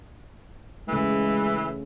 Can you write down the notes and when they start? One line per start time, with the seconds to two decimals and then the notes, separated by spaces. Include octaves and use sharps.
0.88 C#3 E3 G#3 A3